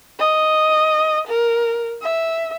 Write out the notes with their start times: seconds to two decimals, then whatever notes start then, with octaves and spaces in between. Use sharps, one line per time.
0.19 D#5
1.28 A#4
2.01 E5